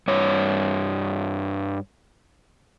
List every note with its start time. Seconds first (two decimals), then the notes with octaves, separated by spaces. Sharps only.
0.08 G2 C#5